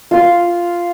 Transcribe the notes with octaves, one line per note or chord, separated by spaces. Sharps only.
F4 C6